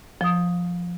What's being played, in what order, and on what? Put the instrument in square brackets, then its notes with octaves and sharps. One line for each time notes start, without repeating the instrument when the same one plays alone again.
[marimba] F3 D#6